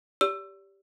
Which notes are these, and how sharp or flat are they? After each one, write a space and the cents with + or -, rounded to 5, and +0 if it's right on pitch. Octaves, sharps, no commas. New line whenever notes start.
G4 +0 D5 -40 E6 +20